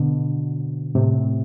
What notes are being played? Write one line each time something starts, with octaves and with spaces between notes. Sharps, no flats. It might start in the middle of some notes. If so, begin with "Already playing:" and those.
Already playing: B2 D3
A2 C3